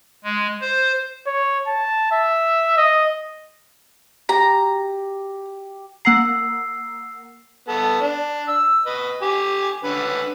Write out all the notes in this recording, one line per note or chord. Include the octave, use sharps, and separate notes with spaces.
G#3
C5
C#5
A5
E5
D#5
G4 A#5
A#3 F#5 A#5 E6 C7
B3 A4
D4
E6
B4 D#5
G4 G#5
D3 C#4 B4